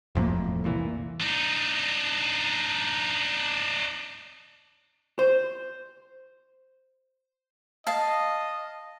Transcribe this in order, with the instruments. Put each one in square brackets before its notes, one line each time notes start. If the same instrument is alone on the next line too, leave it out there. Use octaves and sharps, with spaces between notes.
[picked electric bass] E1 F2 A2 A#3
C2 A#2 E3
[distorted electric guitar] D4 D#4
[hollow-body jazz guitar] C5
[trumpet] D#5 [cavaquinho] F5 A5